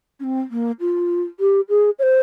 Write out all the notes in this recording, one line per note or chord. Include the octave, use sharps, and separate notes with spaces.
C#4
C4
A#3
F4
G4
G#4
C#5
C5